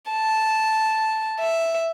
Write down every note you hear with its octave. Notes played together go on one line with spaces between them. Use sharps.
A5
E5